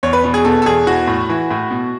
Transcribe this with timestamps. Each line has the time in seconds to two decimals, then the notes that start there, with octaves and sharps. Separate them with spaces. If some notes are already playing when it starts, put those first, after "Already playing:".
0.03 E2 C#5
0.13 B4
0.24 B2
0.34 G#4
0.45 B2 A4
0.62 A4
0.66 E2 G#4
0.87 E3 F#4
1.07 A2
1.29 E3
1.51 A2
1.70 B2